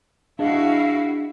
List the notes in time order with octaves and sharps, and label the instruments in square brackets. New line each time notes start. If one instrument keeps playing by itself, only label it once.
[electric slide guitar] D4 G#4 D#5 [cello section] E4 F#4 [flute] F5